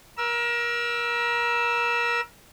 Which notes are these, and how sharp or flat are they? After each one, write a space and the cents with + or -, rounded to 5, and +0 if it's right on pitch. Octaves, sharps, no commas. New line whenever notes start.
A#4 +30 E6 +10